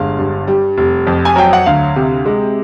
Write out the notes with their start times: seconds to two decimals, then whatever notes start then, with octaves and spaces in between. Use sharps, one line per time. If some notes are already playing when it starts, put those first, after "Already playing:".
Already playing: G1 G#3 F5
0.18 G2
0.47 G3
0.78 F1
1.07 F2
1.25 G#5
1.36 F#3 G5
1.53 F#5
1.66 D2 F5
1.96 C3
2.25 G#3